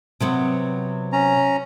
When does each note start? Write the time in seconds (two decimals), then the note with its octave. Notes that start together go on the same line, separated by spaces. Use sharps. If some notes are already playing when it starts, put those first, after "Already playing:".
0.20 C3 F#3 B3
1.13 C#4 A#5